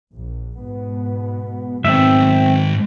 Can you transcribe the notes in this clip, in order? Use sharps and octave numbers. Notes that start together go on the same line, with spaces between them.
A#1
G#2 B2 B3
G#2 B2 D#3 F#3 C4 E5